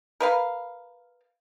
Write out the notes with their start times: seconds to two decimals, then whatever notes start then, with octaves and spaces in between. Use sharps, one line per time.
0.20 A#4 B4 F5